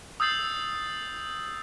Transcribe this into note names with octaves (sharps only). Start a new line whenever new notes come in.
D#6 E6 G6 A6 C7 F#7